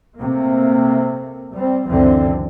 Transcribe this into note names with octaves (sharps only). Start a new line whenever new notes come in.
C3 A3 A#3
G3 C4
C#2 F#2 D3 E3 C4